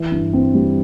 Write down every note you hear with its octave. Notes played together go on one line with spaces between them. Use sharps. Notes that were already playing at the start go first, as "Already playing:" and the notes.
Already playing: E3
G2
C4
G3